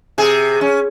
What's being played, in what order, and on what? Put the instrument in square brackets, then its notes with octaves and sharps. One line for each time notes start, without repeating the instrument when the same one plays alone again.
[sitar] C3 G#4
C#4